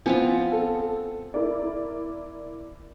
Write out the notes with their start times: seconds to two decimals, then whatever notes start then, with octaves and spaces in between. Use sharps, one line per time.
0.06 F3 B3 C4 F4 G#5
0.52 A4
1.34 E4 A#4 D5